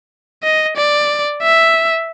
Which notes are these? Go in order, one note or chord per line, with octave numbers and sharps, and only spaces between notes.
D#5
D5
E5